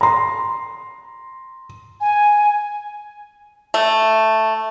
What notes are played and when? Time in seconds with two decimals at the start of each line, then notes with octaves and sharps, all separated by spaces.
0.01 A#5 C6
2.01 G#5
3.74 A3